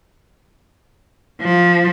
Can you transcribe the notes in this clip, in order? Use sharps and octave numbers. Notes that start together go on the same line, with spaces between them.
F3